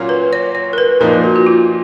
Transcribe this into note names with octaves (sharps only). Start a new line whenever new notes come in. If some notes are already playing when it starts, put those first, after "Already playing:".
Already playing: A#2 F#3 A#3 C#4 F4
B4
C#5
C#5
A#4
B4
A#2 F3 A#3 D#4 A#4
F4
F#4
F#4
F4